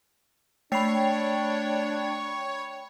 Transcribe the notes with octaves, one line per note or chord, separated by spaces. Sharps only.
A3 D4 C#5 G5 B5 C7 F7